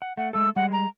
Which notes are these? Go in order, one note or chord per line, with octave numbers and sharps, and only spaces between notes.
F#5
A3 F#5
G#3 A3 A4 E6
G3 G#3 F#5
A#5